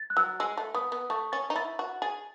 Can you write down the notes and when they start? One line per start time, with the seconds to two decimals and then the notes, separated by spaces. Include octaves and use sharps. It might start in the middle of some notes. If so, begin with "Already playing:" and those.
Already playing: A6
0.10 F#6
0.17 F#3 E6
0.40 G#3 E6
0.57 A3
0.74 B3 D#6
0.92 B3
1.10 A3 C#6
1.32 C#4 A6
1.50 D#4
1.56 E4 A6
1.79 F#4
2.02 G#4 A6